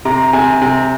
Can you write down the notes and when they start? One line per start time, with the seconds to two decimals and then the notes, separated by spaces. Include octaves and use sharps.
0.05 C3 A#5
0.33 C3 G#5
0.61 C3